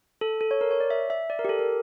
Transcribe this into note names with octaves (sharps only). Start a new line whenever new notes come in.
A4
A4
C#5
A#4
C#5
D5
E5
E5
D5
A#4
G4
A4
A#4